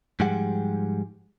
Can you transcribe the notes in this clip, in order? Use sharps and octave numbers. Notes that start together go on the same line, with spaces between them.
G#2 F3 G3 G4 G#4 F#5